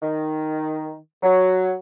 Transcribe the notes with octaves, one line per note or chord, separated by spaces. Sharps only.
D#3
F#3